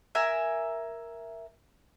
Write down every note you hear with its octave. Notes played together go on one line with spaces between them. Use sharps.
A#4 E5 G#5